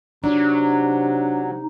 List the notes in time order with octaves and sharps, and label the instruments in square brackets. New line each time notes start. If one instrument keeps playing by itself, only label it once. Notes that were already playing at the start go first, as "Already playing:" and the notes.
[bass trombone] C3 [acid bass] F#3 [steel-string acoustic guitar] D4 [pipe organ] D#4